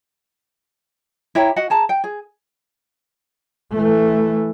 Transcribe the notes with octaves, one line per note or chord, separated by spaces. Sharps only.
E4 G4 C#5 A#5
F#4 D#5 F#5
G#4 A5 A#5
G5
G#4
E3 A3